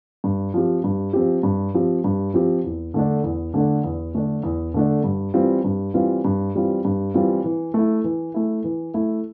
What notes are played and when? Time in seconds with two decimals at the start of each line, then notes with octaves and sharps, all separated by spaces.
0.24 G2
0.54 F3 C4 G4
0.84 G2
1.13 F3 C4 G4
1.43 G2
1.74 F3 C4 G4
2.04 G2
2.34 F3 C4 G4
2.64 E2
2.94 D3 A3 D4
3.24 E2
3.54 D3 A3 D4
3.84 E2
4.14 D3 A3 D4
4.43 E2
4.74 D3 A3 D4
5.04 G2
5.34 E3 G3 C4 F4
5.64 G2
5.94 E3 G3 C4 F4
6.25 G2
6.55 E3 G3 C4 F4
6.85 G2
7.14 E3 G3 C4 F4
7.44 E3
7.74 A3 E4
8.04 E3
8.34 A3 E4
8.64 E3
8.94 A3 E4